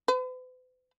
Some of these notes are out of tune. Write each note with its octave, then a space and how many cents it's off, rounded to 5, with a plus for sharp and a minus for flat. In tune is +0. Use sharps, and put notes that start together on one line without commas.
B4 +45